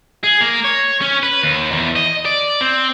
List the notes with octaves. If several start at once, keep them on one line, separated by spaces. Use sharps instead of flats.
G#4
A#3
C#5
C#4
B4
D#2
E2
D#5
D5
C4